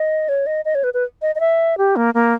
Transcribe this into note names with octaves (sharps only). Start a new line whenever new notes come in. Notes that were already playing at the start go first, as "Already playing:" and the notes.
Already playing: D#5
C#5
D#5
D#5
C#5
B4
B4
D#5
D#5
E5
G4
A#3
A#3